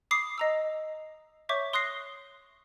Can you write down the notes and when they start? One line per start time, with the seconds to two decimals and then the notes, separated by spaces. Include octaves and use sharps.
0.11 B5 D6 D#6 C7
0.38 D#5 A#5 E6
1.49 C#5 E5 C#6 D6 G6
1.73 C6 D#6 F#6 A#6 C7